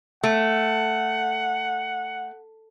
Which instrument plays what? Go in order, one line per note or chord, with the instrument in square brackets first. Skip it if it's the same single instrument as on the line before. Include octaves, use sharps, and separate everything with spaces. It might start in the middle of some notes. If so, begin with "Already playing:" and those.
[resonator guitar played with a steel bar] A3 [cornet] F#5